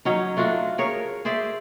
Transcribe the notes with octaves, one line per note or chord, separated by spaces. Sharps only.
F#3 C#4 D#4
A3 D4 F4 F#4
G#4 A#4 C#5
G#4 C5 D5 E5